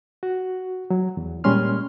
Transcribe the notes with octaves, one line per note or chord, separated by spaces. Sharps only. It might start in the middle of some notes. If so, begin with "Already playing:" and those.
F#4
F#3
E2
A#2 G3 G#3 C#4 C6 F6